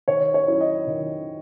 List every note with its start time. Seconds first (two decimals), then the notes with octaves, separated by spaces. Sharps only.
0.08 D#3 C#5
0.34 C#5
0.47 F#3 C#4 E4
0.61 D#5
0.87 D#3